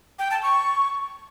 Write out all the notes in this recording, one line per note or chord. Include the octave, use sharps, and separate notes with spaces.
G5
A5
C#6